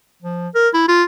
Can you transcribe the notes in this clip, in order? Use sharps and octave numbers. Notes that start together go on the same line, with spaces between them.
F3
A#4
E4
F4